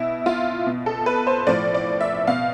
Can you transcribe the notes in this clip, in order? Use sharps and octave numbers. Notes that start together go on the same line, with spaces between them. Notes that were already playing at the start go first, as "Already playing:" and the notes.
Already playing: B2 E4
F4
B2
A4
B4
C5
A2 F3 D5
D5
E5
B2 F5